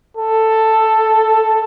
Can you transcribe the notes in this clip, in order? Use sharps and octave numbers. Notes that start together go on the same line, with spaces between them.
A4